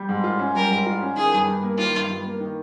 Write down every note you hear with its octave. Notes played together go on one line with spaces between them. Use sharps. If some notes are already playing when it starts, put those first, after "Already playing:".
Already playing: G3
G#2
F4
C#4
G3 A#4
G#2
F4
C#4
D#3 G#4
G2
G2
A#3
D#3 F4
G2
G2
A#3
D#3